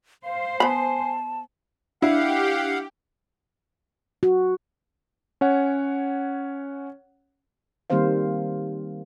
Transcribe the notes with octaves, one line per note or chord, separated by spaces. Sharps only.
C5 F5
B3 G#5 A5 B5
D4 E4 G4 F5 F#5
F#4
C#4 C#5 F#5
D#3 G3 A#3 C4 C5 F5